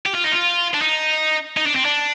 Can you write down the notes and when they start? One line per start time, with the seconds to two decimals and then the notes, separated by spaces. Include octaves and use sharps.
0.06 G4
0.14 F4
0.24 D#4
0.32 F4
0.74 D4
0.81 D#4
1.57 D#4
1.66 D4
1.76 C4
1.85 D4